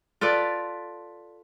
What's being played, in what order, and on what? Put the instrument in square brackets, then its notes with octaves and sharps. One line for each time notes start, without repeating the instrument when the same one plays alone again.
[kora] F4 A4 B4 D5